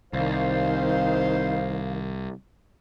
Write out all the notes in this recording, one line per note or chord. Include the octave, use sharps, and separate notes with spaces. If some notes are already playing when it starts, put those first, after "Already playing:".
C2 D#3 C5 F5